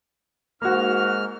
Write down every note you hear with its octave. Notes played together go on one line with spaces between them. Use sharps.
G#2 A#3 F#4 F6